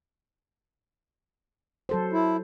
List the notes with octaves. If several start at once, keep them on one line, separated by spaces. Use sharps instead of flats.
F#3 A4 C5
E4